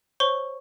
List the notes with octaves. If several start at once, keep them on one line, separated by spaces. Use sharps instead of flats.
C5 C#5 C#6